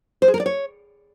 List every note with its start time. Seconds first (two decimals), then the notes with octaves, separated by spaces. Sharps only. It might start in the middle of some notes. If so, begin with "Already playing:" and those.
0.22 C5
0.28 G#4
0.34 A#4
0.40 D5
0.46 C#5